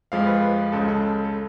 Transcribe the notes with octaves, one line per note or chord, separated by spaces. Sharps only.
F2 F3 G#3 F5
B4
B4
C#2 C#3 G#3 A4
A4
A4